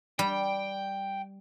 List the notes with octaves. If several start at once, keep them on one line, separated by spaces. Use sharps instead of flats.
G3 G5